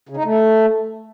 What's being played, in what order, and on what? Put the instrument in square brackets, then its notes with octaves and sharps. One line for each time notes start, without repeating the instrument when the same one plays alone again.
[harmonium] C#3
D#4
A3